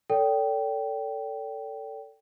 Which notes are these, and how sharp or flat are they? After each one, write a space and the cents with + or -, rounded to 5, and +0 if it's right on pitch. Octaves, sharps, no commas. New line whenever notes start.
A4 +20 D5 -45 G5 -10